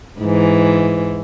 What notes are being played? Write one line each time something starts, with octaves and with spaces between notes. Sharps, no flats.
G#2 E3